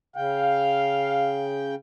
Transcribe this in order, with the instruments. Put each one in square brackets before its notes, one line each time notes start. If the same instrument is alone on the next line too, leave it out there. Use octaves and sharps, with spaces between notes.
[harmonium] C#3 G5 [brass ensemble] F5